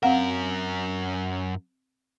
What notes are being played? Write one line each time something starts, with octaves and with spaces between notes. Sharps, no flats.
F#2 C4 A#4 F5 F#5